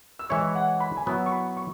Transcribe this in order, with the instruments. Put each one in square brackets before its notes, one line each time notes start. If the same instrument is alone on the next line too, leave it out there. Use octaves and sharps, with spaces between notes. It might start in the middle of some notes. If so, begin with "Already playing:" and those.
[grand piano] E6
[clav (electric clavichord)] E3 G#3 E4 C#5 [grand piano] C#6
[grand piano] F#5
B5
G#5
[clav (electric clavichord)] F#3 B3 E4 [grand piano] B5
[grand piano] C#6
B5
C#6